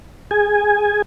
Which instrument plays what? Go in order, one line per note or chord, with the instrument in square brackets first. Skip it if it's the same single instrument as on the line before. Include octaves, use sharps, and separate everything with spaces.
[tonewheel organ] G#4 G#5